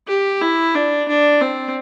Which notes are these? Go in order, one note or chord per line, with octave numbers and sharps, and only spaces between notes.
G4
E4
D4
D4
C4